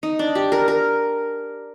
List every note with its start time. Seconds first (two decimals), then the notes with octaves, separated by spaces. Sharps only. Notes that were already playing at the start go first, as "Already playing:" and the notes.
0.03 D#4
0.19 D4
0.35 G4
0.52 A#4
0.68 A#4